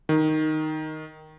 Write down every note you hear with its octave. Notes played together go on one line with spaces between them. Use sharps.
D#3